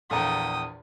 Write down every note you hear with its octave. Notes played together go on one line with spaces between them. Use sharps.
A#1 E2 A4 F5 G5 A#5 D#6